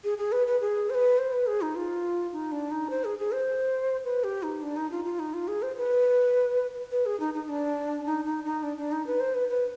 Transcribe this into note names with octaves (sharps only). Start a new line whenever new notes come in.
G#4
G#4
B4
B4
G#4
C5
B4
C5
B4
G#4
D#4
F4
D#4
D4
D#4
C5
G#4
G#4
C5
B4
G4
D#4
D4
D#4
F4
F4
D#4
F4
G#4
C5
B4
B4
G#4
D#4
D#4
D4
D#4
D#4
D#4
D4
D4
D#4
B4
C5
B4
B4